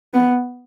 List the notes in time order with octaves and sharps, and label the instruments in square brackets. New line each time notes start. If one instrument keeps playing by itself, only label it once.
[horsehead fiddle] B3